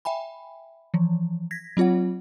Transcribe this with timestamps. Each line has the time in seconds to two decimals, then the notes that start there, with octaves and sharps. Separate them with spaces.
0.05 E5 G5 G#5 B5
0.94 E3 F3
1.51 G#6 A#6 B6
1.77 F#3 C4 F4 C#5 F#5